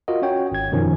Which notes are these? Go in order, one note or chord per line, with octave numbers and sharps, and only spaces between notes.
F4 F#4 A#4 D#5
C#4 F#4 C#5 G5
G#1 G#6
F#2 B2 D#3 F3 C#4